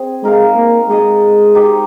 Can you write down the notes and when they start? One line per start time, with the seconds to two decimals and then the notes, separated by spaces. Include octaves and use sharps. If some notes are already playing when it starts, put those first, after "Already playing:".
Already playing: C4 G#4
0.23 G#3 D#4 A#4 F5
0.56 A#3
0.89 G#3 D#4 G#4 D#5
1.55 D#4 G4 C5